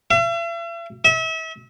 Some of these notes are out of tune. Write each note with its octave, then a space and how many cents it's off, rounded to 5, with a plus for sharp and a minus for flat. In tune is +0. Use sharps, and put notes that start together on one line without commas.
E5 +45
E5 -35